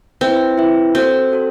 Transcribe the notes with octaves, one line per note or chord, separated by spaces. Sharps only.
C4 E4 B4 E5 G5
E4 B4 E5 G5
C4 F#4 A4 C5 G5
F#4 A4 C5